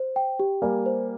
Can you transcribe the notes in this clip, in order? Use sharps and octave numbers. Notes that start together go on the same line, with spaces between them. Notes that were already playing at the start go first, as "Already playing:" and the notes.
Already playing: C5
G5
G4
G3 A#3 G#5
C5